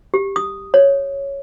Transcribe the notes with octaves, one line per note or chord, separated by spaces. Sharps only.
G4
D#6
C#5